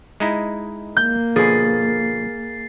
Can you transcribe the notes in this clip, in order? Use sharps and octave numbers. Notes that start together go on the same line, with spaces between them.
G#3 D#4 E4
A#3 G6
B2 D3 F3 G#4 A6 C7